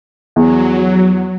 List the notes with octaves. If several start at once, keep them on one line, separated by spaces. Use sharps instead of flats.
E2 F#3